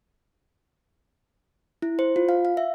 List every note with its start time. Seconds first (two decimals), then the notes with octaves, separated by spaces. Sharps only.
1.82 E4
1.99 C5
2.16 F4
2.29 F5
2.45 F5
2.57 E5